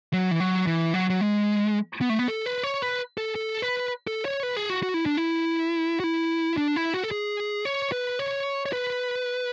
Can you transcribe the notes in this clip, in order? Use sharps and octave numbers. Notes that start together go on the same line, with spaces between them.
F#3
E3
F#3
E3
F#3
F#3
G#3
B3
A3
B3
A4
B4
C#5
B4
A4
A4
B4
A4
C#5
B4
G#4
F#4
F#4
E4
D4
E4
F#4
E4
D4
E4
F#4
A4
G#4
C#5
B4
C#5
C#5
B4